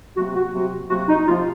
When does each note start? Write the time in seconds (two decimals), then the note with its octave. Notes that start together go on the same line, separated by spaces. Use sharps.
0.16 C3 F#3 A#3 F#4
0.34 F#4
0.52 C3 F#3 A#3 F#4
0.89 C3 F#3 A#3 F#4
1.08 D#4
1.27 C3 F3 A#3 F4